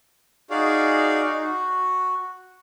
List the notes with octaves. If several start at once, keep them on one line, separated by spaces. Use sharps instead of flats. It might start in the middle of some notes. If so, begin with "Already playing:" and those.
D#4 F#4 G#4 D5 F5
D#4
F#4